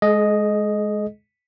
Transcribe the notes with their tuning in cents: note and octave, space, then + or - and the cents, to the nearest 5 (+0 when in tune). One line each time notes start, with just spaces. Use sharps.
G#3 +10 G#4 +45 D#5 +0